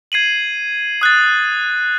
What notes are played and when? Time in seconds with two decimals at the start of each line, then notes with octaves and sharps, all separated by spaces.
0.12 G#6 C7 D#7 F#7
1.01 D#6 F#6 A6